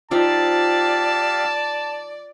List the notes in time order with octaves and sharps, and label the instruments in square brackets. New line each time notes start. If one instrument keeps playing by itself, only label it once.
[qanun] F3 D#4 [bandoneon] G4 F5 E6 [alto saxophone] D5 [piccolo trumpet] A5